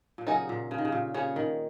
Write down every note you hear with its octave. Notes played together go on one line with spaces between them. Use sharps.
A#2
C#3 F#3 D#4 G#4 D#5
A#2
C#3
D#3
C#3
A#2
C#3 C#4 G#4 C#5
D#3